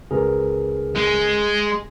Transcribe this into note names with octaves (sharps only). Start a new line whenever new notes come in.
C#2 G#4 A#4 B4
G#3